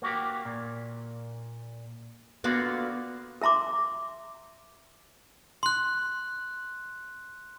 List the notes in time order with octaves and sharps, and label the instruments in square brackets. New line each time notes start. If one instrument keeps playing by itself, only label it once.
[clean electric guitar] A#3 F#4 G4
A#2
[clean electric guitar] D3 A#3 F4 [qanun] B3 F#4 D5
[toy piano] A#4 E5 A#5 C6 D6
[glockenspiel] C6 F#6